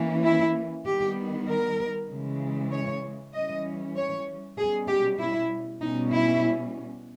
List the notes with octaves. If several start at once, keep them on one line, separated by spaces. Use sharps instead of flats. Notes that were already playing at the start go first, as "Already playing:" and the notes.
Already playing: E3 A#3 C#4
E4
D#3 G3 B3 G4
A#4
C#3 E3 G#3
C#5
E3 G3 C#4 D#5
C#5
B2 G3 C#4 G#4
G4
E4
B2 G3 C#4 D#4
E4